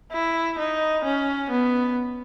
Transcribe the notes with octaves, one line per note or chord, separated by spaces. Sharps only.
E4
D#4
C#4
B3